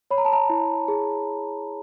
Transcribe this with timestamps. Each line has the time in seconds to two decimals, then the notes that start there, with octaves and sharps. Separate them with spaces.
0.11 C#5 B5
0.18 A#5
0.25 A5
0.33 A#5
0.50 E4
0.88 G#4